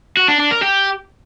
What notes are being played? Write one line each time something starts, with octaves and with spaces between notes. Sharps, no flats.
F#4
D4
D4
A#4
G4